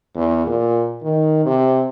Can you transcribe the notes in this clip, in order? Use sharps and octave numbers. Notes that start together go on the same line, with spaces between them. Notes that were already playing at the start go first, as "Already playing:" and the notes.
E2
A#2
D#3
C3